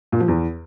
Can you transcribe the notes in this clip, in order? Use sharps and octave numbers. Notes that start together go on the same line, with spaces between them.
A#2
F3
E2